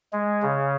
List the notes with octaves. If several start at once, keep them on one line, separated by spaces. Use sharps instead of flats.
G#3
C#3